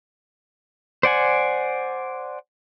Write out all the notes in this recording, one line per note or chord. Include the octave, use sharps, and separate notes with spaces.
C5 D5 F#5 G#5